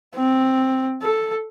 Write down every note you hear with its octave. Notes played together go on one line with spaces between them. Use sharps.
C4
A4